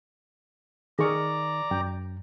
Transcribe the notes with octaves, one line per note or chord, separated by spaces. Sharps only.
D#3 G#4 A#4 D5 A#5 C#6
F#2 G5